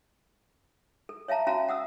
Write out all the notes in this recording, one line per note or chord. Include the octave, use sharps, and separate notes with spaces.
A4
C#5 E5 F5 A5 A#5
C#4 F#4 E5 F5 A5 A#5
F#5 D#6 E6